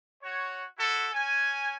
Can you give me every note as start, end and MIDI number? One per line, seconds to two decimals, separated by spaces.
0.23 0.63 66
0.23 0.63 73
0.78 1.08 64
0.78 1.08 66
0.78 1.08 69
1.13 1.76 61
1.13 1.76 80